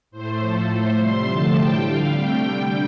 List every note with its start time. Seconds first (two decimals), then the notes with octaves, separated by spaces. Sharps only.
0.11 A2 A3 C5
0.39 A2 F3 A3 A4
0.68 A2 A3 C5
0.97 C3 G3 C6
1.26 D3 F3 A3 A5
1.54 A2 G3 G5
1.83 D3 G3 F5
2.11 C3 A3 G5
2.41 D3 G3